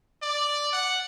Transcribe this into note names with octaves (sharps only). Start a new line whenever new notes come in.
D5
F#5